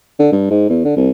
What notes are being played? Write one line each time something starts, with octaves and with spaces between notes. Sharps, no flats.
D3
G2
G#2
E2
D3
C2